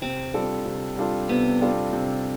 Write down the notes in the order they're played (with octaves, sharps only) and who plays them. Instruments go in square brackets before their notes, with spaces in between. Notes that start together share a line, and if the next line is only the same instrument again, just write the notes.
[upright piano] C3 [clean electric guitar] C4
[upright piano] G3 D4 F4 A4
C3
G3 D4 F4 A4
[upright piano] C3 [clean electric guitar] B3
[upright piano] G3 D4 F4 A4
C3